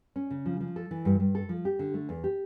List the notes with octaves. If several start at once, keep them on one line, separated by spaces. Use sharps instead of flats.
C#4
C#3
F3
F3
A4
E3
G2
G2
A4
F3
G4
D3
A3
E2
G4